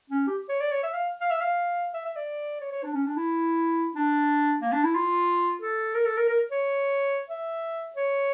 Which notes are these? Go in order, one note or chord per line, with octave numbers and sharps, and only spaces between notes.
C#4
G4
C#5
D5
C#5
E5
F5
F5
E5
F5
E5
E5
D5
C#5
C#5
D4
C#4
D4
E4
D4
A#3
D4
E4
F4
A4
A#4
A4
A#4
A#4
C#5
E5
C#5